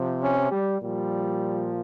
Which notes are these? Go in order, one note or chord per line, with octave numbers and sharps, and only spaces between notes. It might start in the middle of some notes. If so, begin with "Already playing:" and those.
Already playing: C3 F3
C#4
G3
A#2 F3 G3